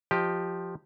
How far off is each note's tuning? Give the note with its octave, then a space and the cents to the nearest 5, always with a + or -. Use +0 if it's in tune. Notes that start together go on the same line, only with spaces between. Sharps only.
F3 +5 G4 +0 D#5 +0